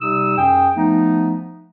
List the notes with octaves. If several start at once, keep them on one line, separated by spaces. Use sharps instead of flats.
C3 G3 D#4 D#6 E6
F#2 G#4 G5
F3 A3 B3 D#4